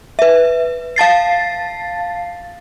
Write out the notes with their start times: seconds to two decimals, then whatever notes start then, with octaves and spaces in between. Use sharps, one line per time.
0.19 B4 E5
0.96 F5 A5 A6 C7